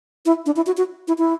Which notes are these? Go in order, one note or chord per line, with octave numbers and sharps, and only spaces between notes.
E4
D4
E4
F#4
F#4
E4
E4